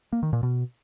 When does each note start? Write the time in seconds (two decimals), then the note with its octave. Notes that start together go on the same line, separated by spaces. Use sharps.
0.13 A#3
0.23 D#3
0.33 A#2
0.43 B2